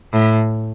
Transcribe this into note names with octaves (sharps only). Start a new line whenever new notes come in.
A2